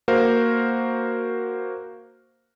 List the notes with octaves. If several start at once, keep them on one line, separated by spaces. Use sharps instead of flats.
A#3 F#4 A#4 C5 F5